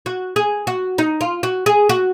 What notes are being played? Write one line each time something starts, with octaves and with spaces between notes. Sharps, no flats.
F#4
G#4
F#4
D#4
F4
F#4
G#4
F#4